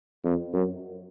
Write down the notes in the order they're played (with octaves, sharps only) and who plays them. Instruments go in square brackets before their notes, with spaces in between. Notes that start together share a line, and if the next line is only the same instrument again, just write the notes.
[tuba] F2
F#2